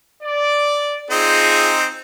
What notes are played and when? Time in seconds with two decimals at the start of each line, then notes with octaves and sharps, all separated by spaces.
0.22 D5
1.10 C4 D#4 F4 G#4